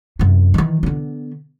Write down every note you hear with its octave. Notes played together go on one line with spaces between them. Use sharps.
F#2 C3
D#3 E3
D3 B3